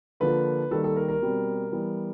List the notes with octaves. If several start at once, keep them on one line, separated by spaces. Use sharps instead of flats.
D3 F3 A#3 B4
D#3 G3 A#3 A4
A4
A#4
A#4
B2 G3 C4
E3 G3 B3